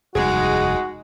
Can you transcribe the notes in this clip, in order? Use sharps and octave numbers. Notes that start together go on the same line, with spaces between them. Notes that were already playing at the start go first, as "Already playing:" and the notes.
F1 D#2 G3 G#3 D#4 F#4 G#4